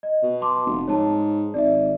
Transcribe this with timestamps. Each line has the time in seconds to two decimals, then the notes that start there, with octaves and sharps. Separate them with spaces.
0.03 D#5
0.23 B2
0.41 A5 C6 D6
0.66 F1
0.88 G#2 C#5 A5
1.54 G#1 D5 E5